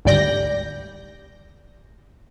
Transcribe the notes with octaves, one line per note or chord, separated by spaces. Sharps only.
G#1 D2 G3 D5 G6 A#6